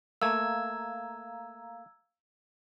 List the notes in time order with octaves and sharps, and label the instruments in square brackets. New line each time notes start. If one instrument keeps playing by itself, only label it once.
[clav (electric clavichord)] A3 A#3 [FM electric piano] F5 A#5 [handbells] E6 G#6